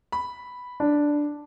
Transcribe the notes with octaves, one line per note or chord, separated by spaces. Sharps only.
B5
D4